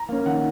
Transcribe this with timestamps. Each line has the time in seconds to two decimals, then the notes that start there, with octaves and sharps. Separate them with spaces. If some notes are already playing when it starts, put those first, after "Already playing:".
Already playing: A#5
0.09 A#3 C#4
0.26 D#3 F#5